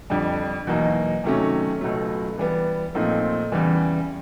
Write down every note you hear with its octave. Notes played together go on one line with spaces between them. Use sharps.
F2 D3 G3
E2 B2 F#3 A#3 D#4
C3 D#3 F#3 A3 C#4
C#2 B2 F#3 A3
E3 G3 B3
A#2 F3 A3 C4 D#4
E2 C#3 E3 G3